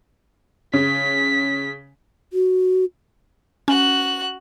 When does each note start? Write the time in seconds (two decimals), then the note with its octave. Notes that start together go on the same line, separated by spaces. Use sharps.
0.73 C#3 B6
2.33 F#4
3.68 C#4 F#4 F#6